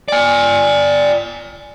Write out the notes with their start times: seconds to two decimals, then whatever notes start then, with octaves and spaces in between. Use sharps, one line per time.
0.08 D5 G#5